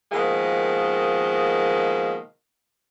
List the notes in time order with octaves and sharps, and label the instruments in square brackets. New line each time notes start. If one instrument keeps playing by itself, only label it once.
[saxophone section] B2 D#3 F3 G#3 A#3